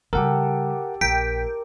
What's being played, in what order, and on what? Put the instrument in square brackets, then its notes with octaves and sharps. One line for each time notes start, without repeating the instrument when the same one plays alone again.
[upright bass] C#3 G3 [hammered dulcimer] G4 A4 [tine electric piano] A#4 F#5
[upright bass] A#1 [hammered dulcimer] A#4 [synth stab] G5 [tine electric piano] B6